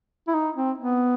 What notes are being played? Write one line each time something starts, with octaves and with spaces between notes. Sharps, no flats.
E4
D#4
C4
B3